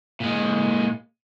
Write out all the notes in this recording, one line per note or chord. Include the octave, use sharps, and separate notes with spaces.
A#2 G#3